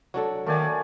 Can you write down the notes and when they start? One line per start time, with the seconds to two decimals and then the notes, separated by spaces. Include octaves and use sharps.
0.14 F#3 D4 A4
0.46 D#3 A3 A#3 D5 G#5